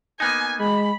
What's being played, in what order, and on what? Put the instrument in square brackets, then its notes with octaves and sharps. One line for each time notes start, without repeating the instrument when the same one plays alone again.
[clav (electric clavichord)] A#3 B3 D#4 [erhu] G#5
[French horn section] G#3 [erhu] B5